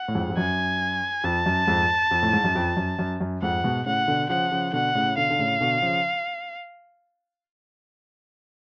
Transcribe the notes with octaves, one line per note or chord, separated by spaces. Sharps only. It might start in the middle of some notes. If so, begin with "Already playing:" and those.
Already playing: F#5
A2
F2 G#2
F2
F#2 G#5
F2 A5
F#2
F2 G#2
F2
A2
G#2
F#2
F2
F#2
F#2
F#2
F2 G#2 F#5
G#2 B2
A2 C#3 F#5
B2 D3
C#3 F3 F#5
C#3 F3
B2 D3 F#5
A2 C#3
B2 D3 F5
D3
A2 C#3
B2 D3
C#3 F3